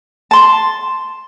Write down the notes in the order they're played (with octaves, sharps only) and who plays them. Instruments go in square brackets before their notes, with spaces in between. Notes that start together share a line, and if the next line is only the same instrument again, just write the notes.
[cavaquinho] A5 C6